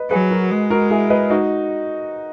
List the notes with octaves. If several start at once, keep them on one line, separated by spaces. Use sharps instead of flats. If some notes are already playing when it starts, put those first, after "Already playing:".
Already playing: B4 D#5
F#3 G#4 B4
F#4 A#4
G#3
F#4 A#4
E4 G#4
B4 D#5
D#4 F#4